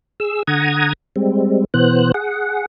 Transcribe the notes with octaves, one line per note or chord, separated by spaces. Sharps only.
G#4 E6
D3 F#5 A#5 D#6 G#6
G3 G#3 C4
B2 E3 B3 C5 F#6
G#4 F#5